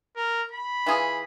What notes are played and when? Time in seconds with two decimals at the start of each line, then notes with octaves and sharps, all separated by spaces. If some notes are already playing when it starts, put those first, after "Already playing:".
0.16 A#4
0.52 B5
0.86 E3 F4 G#4